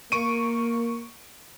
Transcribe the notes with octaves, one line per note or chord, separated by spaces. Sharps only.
A#3 C#6 D7 D#7